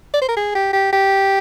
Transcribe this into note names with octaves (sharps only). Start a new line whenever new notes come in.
D5
C5
A#4
G#4
G4
G4
G4